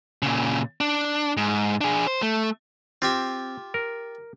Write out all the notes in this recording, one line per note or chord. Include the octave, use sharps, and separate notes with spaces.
A#2 C#3
D4
G#2
D4 G#4
C5
A3
C4 F4 G4 E5
A#4